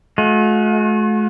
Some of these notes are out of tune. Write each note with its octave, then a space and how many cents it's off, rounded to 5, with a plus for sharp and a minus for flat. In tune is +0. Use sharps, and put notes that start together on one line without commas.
A3 -45 F#4 -45